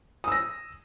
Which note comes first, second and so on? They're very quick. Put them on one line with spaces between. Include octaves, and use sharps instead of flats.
D#6 E6 A#6